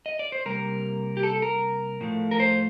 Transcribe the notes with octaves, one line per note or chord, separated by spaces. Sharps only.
D#5
D5
C5
C3 G3 A#3 A#4
G4
A4
A#4
A2 F3 A3
A#4
C5